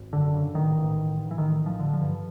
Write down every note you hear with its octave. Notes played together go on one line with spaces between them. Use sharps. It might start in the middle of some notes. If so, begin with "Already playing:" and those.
Already playing: G#1
F#2 D3
C#3
A1 D#3
A1
A1
A1
E3
A1 D#3
A1
F3
D3
F3
G2